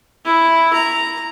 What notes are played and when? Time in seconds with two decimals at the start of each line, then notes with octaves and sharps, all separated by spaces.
0.25 E4
0.73 A#5